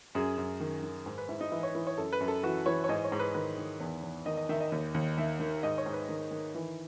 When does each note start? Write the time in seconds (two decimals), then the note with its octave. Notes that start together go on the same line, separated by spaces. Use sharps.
0.15 F#2 G#4
0.38 F#2
0.60 D#3
0.83 D#3
1.06 G#2
1.18 B4
1.29 G#2 E4
1.41 D#4
1.52 E3 E4
1.63 C#5
1.75 E3
1.87 C#5
1.98 F#2 A4
2.13 B4
2.20 F#2
2.28 A4
2.43 E3 F#4
2.66 E3 C#5
2.84 C#5
2.89 G#2 D#5
3.04 C#5
3.12 G#2
3.19 B4
3.34 D#3 B4
3.58 D#3
3.80 E2
4.03 E2
4.26 D#3 D#5
4.37 D#5
4.49 D#3 E5
4.60 D#5
4.72 D#2
4.94 D#2
5.18 D#3 E5
5.40 D#3
5.63 G#2 D#5
5.78 C#5
5.86 G#2
5.93 B4
6.09 D#3
6.31 D#3
6.55 E3